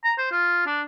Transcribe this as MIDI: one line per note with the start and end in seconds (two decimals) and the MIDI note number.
0.04 0.13 82
0.18 0.29 72
0.32 0.63 65
0.66 0.82 62